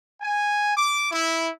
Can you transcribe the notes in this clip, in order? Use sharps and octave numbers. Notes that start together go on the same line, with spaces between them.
G#5
D6
E4